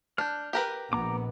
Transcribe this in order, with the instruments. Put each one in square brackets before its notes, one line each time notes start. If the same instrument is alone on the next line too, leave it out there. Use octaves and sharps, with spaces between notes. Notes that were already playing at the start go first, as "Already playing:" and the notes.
[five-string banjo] D4 [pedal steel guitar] F6 G6
[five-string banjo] G4 A#4 B4
[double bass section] A#1 B3 [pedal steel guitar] A#5 D6